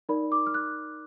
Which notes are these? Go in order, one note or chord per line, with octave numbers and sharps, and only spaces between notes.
D#4 A#4 D5 B5
D6
F6
F#6